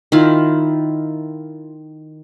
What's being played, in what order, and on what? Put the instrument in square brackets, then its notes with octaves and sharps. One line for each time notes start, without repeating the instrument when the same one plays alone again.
[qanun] D#3 E4 F4